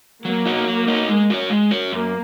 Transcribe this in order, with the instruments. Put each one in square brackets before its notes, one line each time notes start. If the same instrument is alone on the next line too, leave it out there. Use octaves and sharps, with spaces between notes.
[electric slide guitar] F#3 [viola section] A#3
[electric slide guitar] D#4 F#4 C#5
F#3
D#4 F#4 C#5
G#3
F#4 A#4 C#5
G#3
F#4 A#4 C#5
[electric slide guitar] F#2 [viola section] A#3